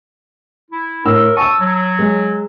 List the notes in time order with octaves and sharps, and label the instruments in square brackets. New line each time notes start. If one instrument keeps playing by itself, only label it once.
[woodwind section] E4
[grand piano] A2 E6 [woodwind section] A#4
[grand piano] A5 E6 [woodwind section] C#6 D#6
[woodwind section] F#3
[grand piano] G#3